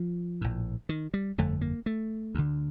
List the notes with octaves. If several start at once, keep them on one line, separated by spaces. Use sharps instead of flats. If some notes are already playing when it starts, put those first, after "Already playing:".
Already playing: F3
A#1 A2
D#3
G3
G1 F2 D3 A3
A#3
A3
D2 D3